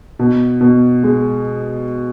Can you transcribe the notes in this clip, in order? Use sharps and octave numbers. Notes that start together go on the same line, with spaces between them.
B2
B2
G#3